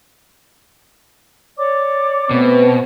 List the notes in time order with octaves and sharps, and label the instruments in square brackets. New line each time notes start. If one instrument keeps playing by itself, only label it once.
[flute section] C#5 D5 D6
[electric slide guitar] B2 [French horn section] A3 B3 B4 [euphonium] C4